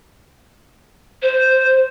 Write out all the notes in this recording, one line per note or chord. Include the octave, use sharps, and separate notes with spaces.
C5